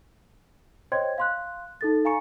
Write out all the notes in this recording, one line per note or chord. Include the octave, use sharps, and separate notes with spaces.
C5 C#5 D#5 G5 C6 G#6
F5 C6 F#6
D#4 A4 A6
F5 G#5 A#5 C#6 C#7